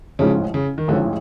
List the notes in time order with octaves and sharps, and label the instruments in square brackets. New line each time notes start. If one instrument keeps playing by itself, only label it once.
[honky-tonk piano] A1 G#2 F3 G#3 C#4 [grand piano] C#3
[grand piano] C#3
D#3
[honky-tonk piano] A1 G#2 F3 G#3 C#4 [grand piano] D3